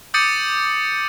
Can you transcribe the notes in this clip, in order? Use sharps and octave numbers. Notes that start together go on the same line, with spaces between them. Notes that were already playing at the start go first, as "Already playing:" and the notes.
D6 D#6 G6 A6 C#7 D#7